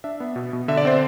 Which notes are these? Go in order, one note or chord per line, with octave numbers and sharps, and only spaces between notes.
D4 E5
B3
B2
B2
D3 E5
D5
C4 C5